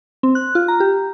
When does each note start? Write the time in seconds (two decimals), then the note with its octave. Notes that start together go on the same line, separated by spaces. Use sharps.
0.23 C4
0.35 F#6
0.55 F4
0.68 A#5
0.80 G4